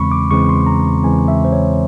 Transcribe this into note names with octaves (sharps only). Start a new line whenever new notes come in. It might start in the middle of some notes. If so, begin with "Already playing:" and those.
Already playing: E2 C#3 E3 G#3 C4 B5 C#6
D6
E2 C#3 E3 G#3 C4 C#6
C6
A#5
E2 C#3 E3 G#3 C4 G#5
E5
C5
C#5